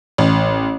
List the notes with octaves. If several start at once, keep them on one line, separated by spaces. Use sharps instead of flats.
A1